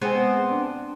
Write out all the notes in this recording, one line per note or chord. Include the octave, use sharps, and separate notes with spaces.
G#3 B3 C4 C5 G#5
D4